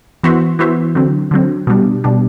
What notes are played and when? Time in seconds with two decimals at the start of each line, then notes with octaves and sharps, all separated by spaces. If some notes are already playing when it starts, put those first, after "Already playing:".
0.23 E3 B3 F#4 C5 E5
0.59 E3 B3 F#4 C5 E5
0.95 D3 F#3 C4
1.31 D3 F#3 C4
1.67 B2 G3 D4
2.04 B2 G3 D4